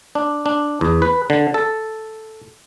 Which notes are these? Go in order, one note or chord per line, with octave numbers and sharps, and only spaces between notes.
D4
D4
E2
B4
D3
A4